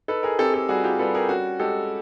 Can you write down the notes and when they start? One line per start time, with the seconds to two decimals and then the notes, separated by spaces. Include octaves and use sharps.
0.08 D#4 A4 B4
0.23 G#4 A#4
0.39 C4 G4 A4
0.54 G4 A4
0.69 G3 F#4 G#4
0.84 F4 G4
0.99 G3 A4 B4
1.14 G#4 A#4
1.29 C#4 F#4
1.60 G#3 G4 A4